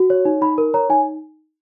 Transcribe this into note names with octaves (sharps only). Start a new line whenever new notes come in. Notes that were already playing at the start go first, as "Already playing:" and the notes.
Already playing: F#4
C#5
D#4
D#4 B5
A#4
C#5 A#5
D#4 G#5